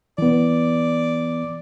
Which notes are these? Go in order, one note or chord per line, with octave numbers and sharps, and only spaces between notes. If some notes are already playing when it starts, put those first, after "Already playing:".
E3 B3 D5